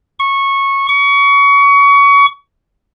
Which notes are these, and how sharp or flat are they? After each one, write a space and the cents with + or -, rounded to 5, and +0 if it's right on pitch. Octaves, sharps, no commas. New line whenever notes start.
C#6 -15
C#6 +25